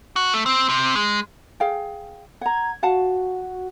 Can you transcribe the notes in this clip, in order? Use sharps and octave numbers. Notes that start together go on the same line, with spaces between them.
F#4
A3
C4
C3
G#3
G#4 F5 G5
F#5 A#5 G#6
F#4 F5 F#5 A5